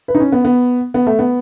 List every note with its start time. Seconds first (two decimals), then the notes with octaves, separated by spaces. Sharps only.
0.08 B4
0.15 D#4
0.20 C#4
0.32 B3
0.45 B3
0.94 B3
1.07 A3
1.19 B3